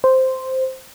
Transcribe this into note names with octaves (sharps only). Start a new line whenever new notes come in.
C5